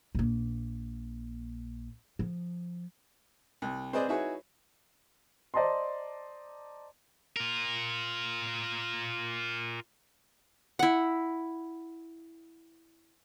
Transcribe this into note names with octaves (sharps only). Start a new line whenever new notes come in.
A#1 A#3
F3
C2
C4 G#4 B4 C5 D5 D#5
D#4 E4 F#4 G#4 B4 C#5
C5 D5 D#5 A5 A#5 C6
F4 A#4
E4 F#5